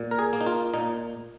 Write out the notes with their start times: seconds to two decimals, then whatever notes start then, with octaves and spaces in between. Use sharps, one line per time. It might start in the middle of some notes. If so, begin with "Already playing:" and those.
Already playing: A#2
0.11 A#4
0.19 G#4
0.33 A#3
0.41 D#4
0.46 F4
0.74 A#2 D#4